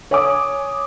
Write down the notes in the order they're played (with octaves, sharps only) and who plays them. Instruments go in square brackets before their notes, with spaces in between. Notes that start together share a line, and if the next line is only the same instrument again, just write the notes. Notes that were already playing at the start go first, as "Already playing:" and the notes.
[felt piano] C#5 G#5 D6 D#6